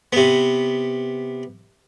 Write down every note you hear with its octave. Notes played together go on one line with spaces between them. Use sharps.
C3 B3